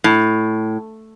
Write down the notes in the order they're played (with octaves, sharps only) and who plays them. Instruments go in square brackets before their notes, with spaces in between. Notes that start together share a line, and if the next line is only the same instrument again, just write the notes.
[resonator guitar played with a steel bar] A2